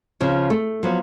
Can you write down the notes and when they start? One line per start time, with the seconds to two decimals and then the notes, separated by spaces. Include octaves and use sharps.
0.20 C#3 F3
0.50 A3
0.83 F3 F#3 B3